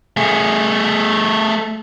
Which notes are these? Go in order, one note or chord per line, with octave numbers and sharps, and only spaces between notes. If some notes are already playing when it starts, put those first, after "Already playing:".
A3 G#4